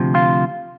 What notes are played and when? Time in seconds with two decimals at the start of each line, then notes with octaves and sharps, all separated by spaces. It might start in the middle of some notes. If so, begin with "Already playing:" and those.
Already playing: D2 C3 F3
0.15 F4